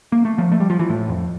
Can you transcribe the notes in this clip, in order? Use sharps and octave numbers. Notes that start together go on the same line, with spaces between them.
A#3
A3
F3
A3
G3
F3
E3
A2
F2